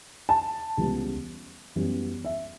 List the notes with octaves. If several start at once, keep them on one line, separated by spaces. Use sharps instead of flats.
A5
C#2 C#3 E3 G3 B3
F#2 E3 G3 B3
E5